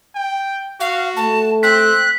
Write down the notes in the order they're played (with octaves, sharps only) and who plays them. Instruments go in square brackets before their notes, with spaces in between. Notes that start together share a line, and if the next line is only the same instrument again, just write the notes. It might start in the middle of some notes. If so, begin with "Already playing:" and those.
[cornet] G5
[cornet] F#4 [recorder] F5
[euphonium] A3 [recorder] A5
[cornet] C4 [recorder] F#6 [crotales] B6